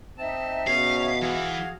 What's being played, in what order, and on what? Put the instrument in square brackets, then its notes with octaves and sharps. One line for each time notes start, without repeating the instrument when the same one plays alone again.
[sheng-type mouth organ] C4 A5 [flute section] D#4 E5
[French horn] B2 [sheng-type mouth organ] C#4 G#4 C#5 [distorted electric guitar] F5
[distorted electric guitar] E3 [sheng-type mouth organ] F#4 G#4 F5